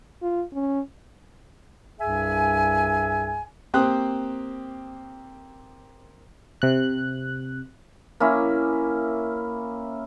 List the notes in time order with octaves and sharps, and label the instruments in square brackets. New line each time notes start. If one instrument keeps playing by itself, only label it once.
[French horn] F4
C#4
[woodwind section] C2 G2 G#4 E5 G#5
[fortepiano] A#3 C4 G4 C5 D#6 F#6
[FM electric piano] C3 F#6
[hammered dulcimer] A#3 C#4 E4